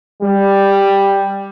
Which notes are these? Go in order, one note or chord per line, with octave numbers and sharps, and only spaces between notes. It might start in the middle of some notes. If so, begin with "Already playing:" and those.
G3